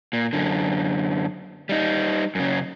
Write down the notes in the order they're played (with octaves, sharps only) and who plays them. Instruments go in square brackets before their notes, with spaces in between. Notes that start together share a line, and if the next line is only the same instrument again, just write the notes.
[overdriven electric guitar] A#2
F#2 D3
G3 D#4
F#2 C#3